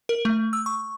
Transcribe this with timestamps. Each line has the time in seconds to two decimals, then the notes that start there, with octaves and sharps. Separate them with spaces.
0.09 A#4
0.25 A3
0.53 E6
0.66 C#6